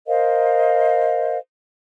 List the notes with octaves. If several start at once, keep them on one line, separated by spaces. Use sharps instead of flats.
A#4 C5 D#5 F5